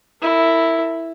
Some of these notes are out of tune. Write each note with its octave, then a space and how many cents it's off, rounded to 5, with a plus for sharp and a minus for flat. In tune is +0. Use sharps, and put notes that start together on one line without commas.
E4 +0 A#4 -45